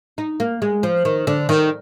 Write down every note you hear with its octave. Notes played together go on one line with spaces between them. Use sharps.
D#4
A#3
G#3
F3
D#3
D3
D#3